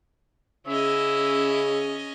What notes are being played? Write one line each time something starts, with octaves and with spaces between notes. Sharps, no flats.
C#3 C#4 E4 D#5 E6